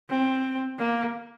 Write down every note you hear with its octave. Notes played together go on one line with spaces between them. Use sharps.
C4
A#3